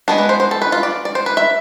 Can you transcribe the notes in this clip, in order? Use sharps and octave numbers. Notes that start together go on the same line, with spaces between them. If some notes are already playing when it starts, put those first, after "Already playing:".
G#3 B3 D4 G#4
B4
C5
C5
A4
B4
F4
D5
D5
C5
B4
E5